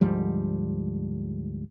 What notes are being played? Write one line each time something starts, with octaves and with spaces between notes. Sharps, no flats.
D2 G#2 F3 G3